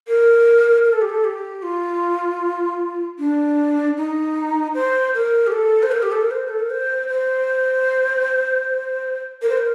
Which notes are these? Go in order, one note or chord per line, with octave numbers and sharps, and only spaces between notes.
A#4
A#4
A4
G4
A4
G4
F4
D4
D#4
C5
A#4
G4
A4
C5
A#4
G4
A4
A#4
C5
A4
A#4
C5
C5
A#4
C5
A#4